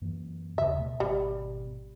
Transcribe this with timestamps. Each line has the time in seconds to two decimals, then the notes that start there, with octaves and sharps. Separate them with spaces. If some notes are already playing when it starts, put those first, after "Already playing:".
0.01 F#2 E3 A#3
0.58 D#1 C#3 E5
0.78 B2 A3
1.00 G#1 B2 G3